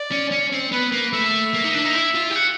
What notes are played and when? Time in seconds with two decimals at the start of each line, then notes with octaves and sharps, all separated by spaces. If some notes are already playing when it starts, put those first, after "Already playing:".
Already playing: D5
0.11 C#4
0.32 C#4
0.53 C4
0.72 B3 B4
0.92 A#3
1.13 A3 E5
1.54 A#3
1.64 D#4
1.74 D4
1.84 D#4
1.94 E4
2.15 F4
2.30 G4
2.35 F#4